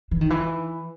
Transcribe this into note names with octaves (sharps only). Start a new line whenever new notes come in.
E3
D#3
E3